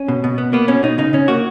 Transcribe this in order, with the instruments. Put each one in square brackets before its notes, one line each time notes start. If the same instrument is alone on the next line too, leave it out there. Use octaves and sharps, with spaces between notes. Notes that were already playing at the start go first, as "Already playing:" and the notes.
Already playing: [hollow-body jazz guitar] C#4
B2
B2
B3
A#3 B3
B2 C#4
B2 D#4
C#3 D#4
C#3 C#4
A#3 F#4